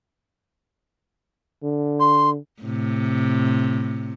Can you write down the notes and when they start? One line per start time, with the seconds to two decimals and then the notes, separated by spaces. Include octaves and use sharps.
1.63 D3
2.00 C6
2.62 A2 C3